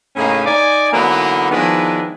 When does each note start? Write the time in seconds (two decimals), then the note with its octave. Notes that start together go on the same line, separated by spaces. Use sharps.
0.16 A2 C#3 A#3 C#4 D#4 G#4
0.45 D#4 D5 G#5
0.92 D3 E3 F#3 A#3 B3 D#4
1.50 D#3 F3 G#3 B3 D4 E4